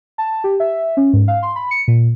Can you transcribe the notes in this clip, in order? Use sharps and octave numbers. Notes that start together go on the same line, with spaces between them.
A5
G4
E5
C#4
G#2
F5
C6
B5
C#7
A#2